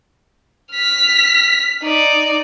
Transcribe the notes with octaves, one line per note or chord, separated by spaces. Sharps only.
F6 B6
D#4 D5